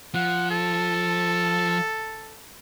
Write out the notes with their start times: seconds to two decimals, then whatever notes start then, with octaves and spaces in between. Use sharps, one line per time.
0.15 F3 F#5
0.50 A4